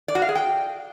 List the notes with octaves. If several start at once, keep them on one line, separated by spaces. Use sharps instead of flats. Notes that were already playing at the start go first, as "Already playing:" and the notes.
D5
F#4
F5
G#4
G5